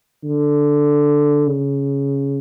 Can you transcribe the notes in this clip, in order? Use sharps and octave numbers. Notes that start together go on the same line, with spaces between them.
D3
C#3